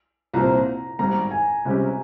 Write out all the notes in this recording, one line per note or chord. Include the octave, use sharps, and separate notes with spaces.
C2 A#2 F3 C4 A#5
G#1 G#2 G3 A#5
G#5
C#2 C3 G3 C#4 G4